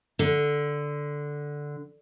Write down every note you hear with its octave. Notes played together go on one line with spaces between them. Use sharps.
D3